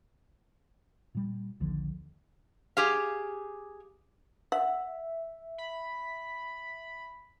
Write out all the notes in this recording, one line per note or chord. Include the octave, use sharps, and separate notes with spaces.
A#2 G3
A#1 D#2 D3 F3
G4 G#4 F5
E5 F#5
B5